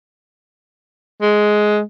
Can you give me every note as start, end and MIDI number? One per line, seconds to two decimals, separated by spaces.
1.22 1.81 56